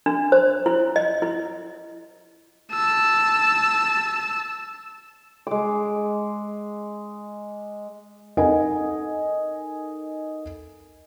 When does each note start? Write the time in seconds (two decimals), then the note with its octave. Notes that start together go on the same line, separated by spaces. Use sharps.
0.06 D4
0.32 C5
0.66 E4
0.96 D#5
1.22 E4
2.72 A5 E6
5.47 G#3 D6
8.37 D#4 A4 A#4 D#5 F#5 G#5